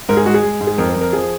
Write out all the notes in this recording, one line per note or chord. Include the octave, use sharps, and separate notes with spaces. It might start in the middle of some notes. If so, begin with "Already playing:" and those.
G#2 A#4
G#4
G#3 F#4
G#4
G#3
G#2
G#4
F2 A#4
A#4
F2
A#4
F3 G#4